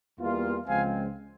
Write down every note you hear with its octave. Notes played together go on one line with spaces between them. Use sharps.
E2 E3 G3 A#3 F4
C#2 C#3 F3 G#3 C4 F5 G#5